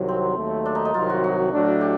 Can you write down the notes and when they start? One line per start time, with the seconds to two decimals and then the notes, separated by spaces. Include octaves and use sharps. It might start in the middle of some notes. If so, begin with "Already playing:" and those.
Already playing: C2 C3 D#3 F#3
0.08 C4
0.37 D#2 D#3 F#3 A3
0.66 D4
0.75 D#4
0.85 D#4
0.94 C2 C3 D#3 F#3 F4
1.10 F#4
1.24 F#4
1.52 A2 F#3 A3 D4
1.81 G4